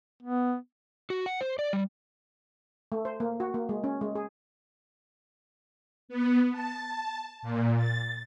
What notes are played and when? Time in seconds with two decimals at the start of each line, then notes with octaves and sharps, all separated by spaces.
0.23 B3
1.10 F#4
1.26 F#5
1.41 C5
1.59 D5
1.73 G3
2.92 A3
3.05 C5
3.20 A#3
3.40 F#4
3.54 A#3
3.69 G#3
3.84 C#4
4.01 G#3
4.15 G#4
6.09 B3
6.52 A5
7.42 A#2
7.76 A6